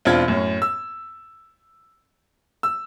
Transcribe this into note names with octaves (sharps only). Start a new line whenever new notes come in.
E1 C4 D4 F4 G#6
F#2 A2 C#4
E6
E6